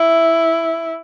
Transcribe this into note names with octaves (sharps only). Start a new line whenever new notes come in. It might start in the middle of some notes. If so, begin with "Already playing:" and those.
Already playing: E4